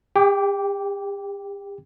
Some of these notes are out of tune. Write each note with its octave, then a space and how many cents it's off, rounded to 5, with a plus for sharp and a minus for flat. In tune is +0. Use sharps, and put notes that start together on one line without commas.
G4 +40 G5 +0 D6 -10